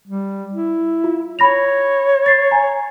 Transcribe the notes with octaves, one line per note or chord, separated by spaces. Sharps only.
G3
E4
F4
C#5 B5 A#6 F7
A6 C7
G#5 A#5